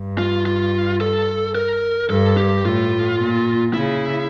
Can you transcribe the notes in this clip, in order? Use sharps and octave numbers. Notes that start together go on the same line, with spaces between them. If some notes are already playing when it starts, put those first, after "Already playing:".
Already playing: G2
F4
F4
A4
A#4
G2 A4
G4
A2 F4
A#2
C#3 E4